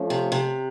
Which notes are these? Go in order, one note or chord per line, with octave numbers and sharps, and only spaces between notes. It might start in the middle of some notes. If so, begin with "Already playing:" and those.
Already playing: F3 A3 C#4
C3
C3